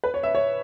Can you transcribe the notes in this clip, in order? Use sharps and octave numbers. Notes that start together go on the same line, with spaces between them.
B4
C#5
E5
C#5